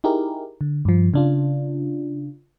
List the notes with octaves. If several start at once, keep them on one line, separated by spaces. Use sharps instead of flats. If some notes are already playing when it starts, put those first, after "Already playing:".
D#4 E4 G4 G#4 A#4
D3
G2 F3
C#3 D4 F4